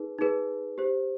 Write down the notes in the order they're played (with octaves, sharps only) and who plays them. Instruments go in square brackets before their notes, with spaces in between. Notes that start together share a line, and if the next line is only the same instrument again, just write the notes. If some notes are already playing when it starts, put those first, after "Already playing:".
Already playing: [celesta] D#4 G#4 B4
D#4 G#4 B4
G4 C5